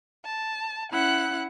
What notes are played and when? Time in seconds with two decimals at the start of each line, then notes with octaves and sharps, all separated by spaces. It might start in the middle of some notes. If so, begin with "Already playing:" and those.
0.25 A5
0.92 C#4 E4 F#5 F#6